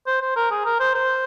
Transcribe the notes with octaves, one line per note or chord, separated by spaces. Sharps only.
C5
C5
A#4
G#4
A#4
C5
C5